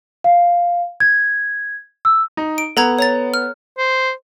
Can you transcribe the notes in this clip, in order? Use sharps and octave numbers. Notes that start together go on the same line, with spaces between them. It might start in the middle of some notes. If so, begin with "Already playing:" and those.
F5
G#6
E6
D#4
D7
B3 A4 A#5 G#6
C#5 A#5 A6
F6
C5